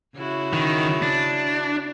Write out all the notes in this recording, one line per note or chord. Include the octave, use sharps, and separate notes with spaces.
C#3 E4 F#4
D#3
D4